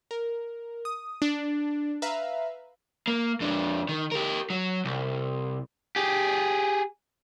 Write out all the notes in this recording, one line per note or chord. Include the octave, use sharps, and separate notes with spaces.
A#4
D#6
D4
B4 E5 F5 A#5
A#3
F2 D4
D#3
G4 A#4
F#3
C2
G4 G#4